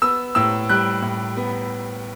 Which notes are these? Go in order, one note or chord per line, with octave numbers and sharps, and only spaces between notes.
B3 E6
A2 E6
G3 F#6
A2
B3